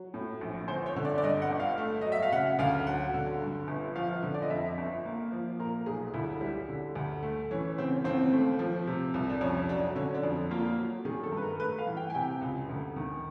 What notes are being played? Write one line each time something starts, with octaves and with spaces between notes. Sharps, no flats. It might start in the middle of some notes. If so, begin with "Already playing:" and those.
Already playing: F#3
A2
A#1
G1 C5
C#5
D3
D5
D5
G2 D#5
F#5
G1
F5
A3
F#3 D#5
E5
F5
C#3 F#5
D2 F5
F#3 F#5
D3
G2
G1
F3 F5
D3
D5
D#5
F2 E5
G1
A#3
F3
A#2 A#4
B1 G#4
D2 E4
G3
D3
D2
A3
E3 C#4
C#3 C4
D#2 C4
A3
F3
C3
C2
D4
F2 C#4
F#3 D4
D3 C#4
D4
F2
A#3 F4
F#3
D#3 G#4
A4
G2
B4
A#4
A3 B4
F5
E3
G5
G#5
C3 G5
C#2
D2
D#3